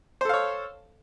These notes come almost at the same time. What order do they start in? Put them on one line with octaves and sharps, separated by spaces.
C5 A4 F5 C#5